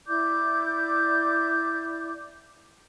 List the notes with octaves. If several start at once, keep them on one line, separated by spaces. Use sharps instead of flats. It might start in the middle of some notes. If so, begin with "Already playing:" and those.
E4 D5 D6 G6